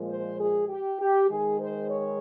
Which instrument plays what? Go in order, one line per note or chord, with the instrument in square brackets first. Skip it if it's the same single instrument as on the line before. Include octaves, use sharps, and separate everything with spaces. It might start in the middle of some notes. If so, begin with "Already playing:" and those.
Already playing: [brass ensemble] A#2 F3 G#3
C5
G#4
G4
G4
D#3 G#3 G#4
C5
C#5